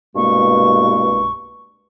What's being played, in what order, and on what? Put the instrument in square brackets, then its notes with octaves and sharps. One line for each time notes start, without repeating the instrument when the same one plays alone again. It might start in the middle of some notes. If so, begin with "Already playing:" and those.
[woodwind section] C2 G2 B2 G#3 A#3 C#6